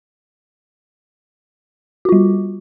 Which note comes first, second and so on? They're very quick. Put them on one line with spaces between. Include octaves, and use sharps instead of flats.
F#4 F4 G3